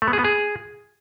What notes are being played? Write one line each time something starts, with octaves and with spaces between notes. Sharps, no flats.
A3
B3
G#4
B3
G#4